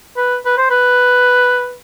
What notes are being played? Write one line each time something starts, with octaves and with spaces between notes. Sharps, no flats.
B4
B4
C5
B4